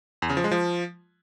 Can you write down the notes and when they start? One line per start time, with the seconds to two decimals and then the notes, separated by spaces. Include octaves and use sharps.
0.22 E2
0.29 C#3
0.37 F3
0.44 G#3
0.51 F3